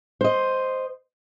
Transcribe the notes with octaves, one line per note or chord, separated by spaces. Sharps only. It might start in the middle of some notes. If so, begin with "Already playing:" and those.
C5 D#5